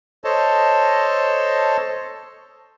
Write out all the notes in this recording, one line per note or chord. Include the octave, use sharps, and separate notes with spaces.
A4 C5 C#5 D#5 A5